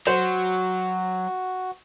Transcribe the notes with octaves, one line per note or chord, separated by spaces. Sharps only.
F#3 F#4 C5